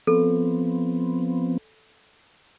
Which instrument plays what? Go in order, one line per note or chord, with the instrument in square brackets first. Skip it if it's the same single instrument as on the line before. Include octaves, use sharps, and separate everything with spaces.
[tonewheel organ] F3 B3 C4 [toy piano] A4